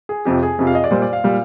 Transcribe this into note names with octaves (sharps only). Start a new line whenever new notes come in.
G#4
F2 C3 F3 G4
G#4
F2 C3 F3
F5
D#5
D5
A#2 G3 C5
D5
F5
A#2 G3